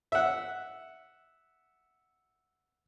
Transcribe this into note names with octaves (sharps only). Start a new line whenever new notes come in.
E5 F#5